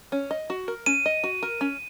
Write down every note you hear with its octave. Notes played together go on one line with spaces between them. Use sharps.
C#4
D#5
F#4
A#4
C#4 D#7
D#5
F#4
A#4
C#4